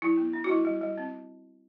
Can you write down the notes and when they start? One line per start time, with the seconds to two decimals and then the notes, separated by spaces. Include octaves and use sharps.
0.02 F#3 E4
0.17 B3
0.33 D4
0.44 F#4
0.49 G3 E4
0.65 G3
0.81 G3
0.98 C4